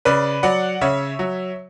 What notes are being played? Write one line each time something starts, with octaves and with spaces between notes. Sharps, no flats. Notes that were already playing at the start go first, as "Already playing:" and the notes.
C#3 B4 D5
F#3 D5 F#5
C#3 C#5 E5
F#3